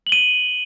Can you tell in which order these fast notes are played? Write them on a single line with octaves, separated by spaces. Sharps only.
F#7 G7 D#7